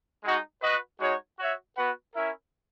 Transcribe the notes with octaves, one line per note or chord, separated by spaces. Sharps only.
G#3 D#4 F#4
F#4 B4 D#5
G#3 D#4 F#4 C#5
F#4 C#5 E5
B3 F#4 B4 F#5
C#4 E4 A#4 E5